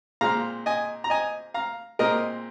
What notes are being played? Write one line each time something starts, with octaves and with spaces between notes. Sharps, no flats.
A#2 G#3 C4 F5 A#5
D#5 G#5
A#5
D#5 G#5
F5 A#5
A#2 G#3 C4 A#4 D#5